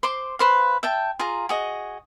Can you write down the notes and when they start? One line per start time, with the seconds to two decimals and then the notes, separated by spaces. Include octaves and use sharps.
0.03 C5 C6 D6
0.39 B4 C5 F5
0.83 E5 G5 A5
1.19 F4 G#4 A#5
1.49 F#4 G#4 D#5